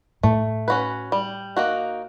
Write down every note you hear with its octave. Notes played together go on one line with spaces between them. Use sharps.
A2 A3
C#4 F#4 B4
G3
A#3 D#4 F#4